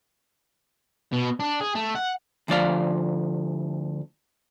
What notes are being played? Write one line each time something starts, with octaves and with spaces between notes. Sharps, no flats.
B2
D4
G#4
A3
F#5
D2 F3 D5 F5